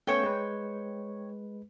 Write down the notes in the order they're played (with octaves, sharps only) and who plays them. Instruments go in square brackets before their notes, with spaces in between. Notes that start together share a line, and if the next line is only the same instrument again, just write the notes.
[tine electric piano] A3 B3 C#4 [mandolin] C5 C#5 G5
[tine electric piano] G#3 B4